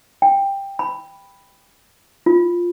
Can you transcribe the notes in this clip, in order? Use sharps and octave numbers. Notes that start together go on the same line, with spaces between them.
G5
B5
F4